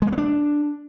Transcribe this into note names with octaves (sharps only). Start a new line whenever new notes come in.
G#3
A#3
B3
D4